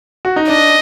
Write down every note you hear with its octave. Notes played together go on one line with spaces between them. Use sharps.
F#4
D#4
D4 D#5